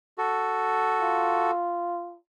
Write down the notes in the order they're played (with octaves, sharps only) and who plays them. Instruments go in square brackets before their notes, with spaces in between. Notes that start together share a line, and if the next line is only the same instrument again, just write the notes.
[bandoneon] F#4 A4
[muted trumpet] F4